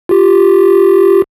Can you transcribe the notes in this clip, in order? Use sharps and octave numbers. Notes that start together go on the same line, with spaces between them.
F4 G4